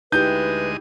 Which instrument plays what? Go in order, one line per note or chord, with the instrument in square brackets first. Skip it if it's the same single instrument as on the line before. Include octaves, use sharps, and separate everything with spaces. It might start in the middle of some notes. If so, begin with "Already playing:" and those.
[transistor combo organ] D2 G#3 D#5 [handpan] D#4 E4 G4 [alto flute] B4 [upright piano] G6